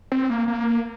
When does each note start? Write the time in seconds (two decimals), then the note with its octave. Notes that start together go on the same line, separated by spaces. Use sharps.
0.12 C4
0.30 A#3
0.48 A#3